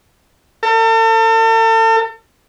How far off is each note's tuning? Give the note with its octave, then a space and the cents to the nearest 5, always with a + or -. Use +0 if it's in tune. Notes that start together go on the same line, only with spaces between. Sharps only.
A4 +40